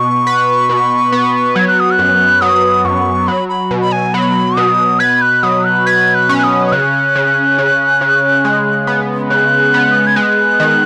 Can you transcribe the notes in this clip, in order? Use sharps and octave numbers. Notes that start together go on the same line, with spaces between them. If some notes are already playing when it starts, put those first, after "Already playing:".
Already playing: B2 C#6
B4
B2
B3
F#3 G#6
F#6
D#6
F#6
F#2
F#3 D#6
F#2 C#6
F#3 B5
B5
B2
B5
G#5
F#3 B5
B2 D#6
B4 G#6
F#6
F#3 D#6
F#6
B4 G#6
F#6
C#4
F#6
D#6
D#6
C#3 F#6
C#3
C#3
C#3
G#3
B3
C#3 F#6
B3
G#6
G#3 F#6
D#3